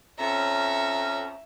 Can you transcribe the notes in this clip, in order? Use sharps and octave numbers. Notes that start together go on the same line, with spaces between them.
F2 C#4 E5 A#5